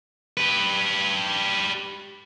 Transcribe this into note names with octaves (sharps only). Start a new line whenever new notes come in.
G4 B4